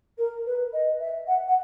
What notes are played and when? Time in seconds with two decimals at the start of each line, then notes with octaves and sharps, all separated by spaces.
0.18 A#4
0.46 B4
0.73 D#5
1.00 E5
1.27 F#5
1.48 F#5